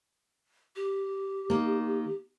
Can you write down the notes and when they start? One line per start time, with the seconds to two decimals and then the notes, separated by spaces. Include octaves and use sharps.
0.76 G4
1.50 D#3 A#3